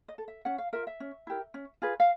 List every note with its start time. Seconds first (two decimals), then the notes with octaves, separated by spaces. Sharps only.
0.08 D#5
0.18 A4
0.28 E5
0.45 C#4 F#5
0.58 F5
0.73 F4 A#4 E5
0.87 E5
1.00 C#4
1.27 E4 G4 A#4
1.54 C#4
1.82 F4 G#4 B4
2.00 F5